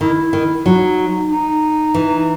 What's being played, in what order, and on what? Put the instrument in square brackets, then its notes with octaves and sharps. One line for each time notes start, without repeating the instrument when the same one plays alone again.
[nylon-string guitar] D#3 [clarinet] E4
[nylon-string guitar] D#3
[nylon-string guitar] F#3 [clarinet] D#4
[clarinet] D#4
[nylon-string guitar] E3